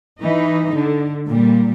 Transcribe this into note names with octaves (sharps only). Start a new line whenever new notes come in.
E3 D#4
D3
A#2 G3